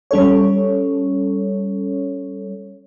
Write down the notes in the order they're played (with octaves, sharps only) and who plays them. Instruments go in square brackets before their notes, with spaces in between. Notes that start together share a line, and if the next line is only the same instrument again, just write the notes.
[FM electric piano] G3 C#4 A4 C#5